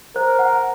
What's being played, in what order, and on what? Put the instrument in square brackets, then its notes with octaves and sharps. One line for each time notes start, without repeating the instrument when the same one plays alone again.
[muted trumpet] A#4 [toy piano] C5
[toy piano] F#5